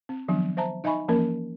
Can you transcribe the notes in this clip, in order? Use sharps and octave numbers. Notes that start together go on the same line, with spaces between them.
C4
D#3 F3 F#3 B3 D4
C5 E5 A5 A#5
D#4 D#5 E5 G#5 B5 C#6
E3 F3 A#3 C#4 A#4